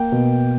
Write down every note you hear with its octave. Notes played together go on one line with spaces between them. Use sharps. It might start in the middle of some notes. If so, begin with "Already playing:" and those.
Already playing: A#3 G5
B2